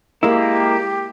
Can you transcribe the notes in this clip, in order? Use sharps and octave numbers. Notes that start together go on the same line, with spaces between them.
G#3 A#3 E4 G4